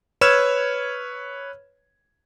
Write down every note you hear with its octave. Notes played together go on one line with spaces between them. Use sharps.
B4 C#5 E6 F6 G#6 E7